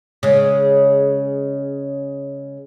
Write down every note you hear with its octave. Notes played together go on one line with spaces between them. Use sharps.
C#3 G#3